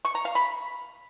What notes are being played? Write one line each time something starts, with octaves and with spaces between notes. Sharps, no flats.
C#6
A#5
F5
B5